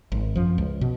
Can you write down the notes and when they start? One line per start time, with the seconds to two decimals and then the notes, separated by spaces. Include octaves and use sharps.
0.12 G#1
0.36 F#2 F3
0.58 C#2
0.81 B2